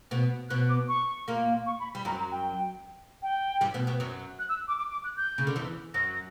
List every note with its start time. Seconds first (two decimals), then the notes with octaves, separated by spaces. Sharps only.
0.11 B2 B3
0.50 B2 B3 F#6
0.69 D6
0.88 C#6
1.28 A#2 A#3
1.66 C#6
1.80 B5
1.93 G3 B5
2.05 F#2 F#3 A#5
2.19 A#5
2.32 G5
3.22 G5
3.61 G2 G3
3.74 B2 B3
3.87 B2 B3
4.00 F#2 F#3
4.39 F#6
4.49 E6
4.68 D6
4.78 D6
4.91 D6
5.04 F#6
5.17 G6
5.38 C#3
5.47 D3
5.56 E2 E3
5.94 F#2 F#3 A#6